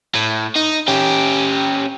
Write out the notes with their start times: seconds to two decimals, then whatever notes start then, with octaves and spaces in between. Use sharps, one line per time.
0.15 A2
0.56 D#4
0.88 C#4 G4